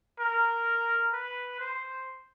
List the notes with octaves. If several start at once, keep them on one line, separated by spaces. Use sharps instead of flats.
A#4
B4
C5